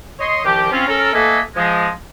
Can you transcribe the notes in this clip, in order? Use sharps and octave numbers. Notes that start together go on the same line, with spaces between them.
C#5 D#5 C6
C2 D#3 F3 G4
C4 C#4 F4
C#4 A4 A#4
A3 A#3 A4 B4 D#5 G#5
F3 G#3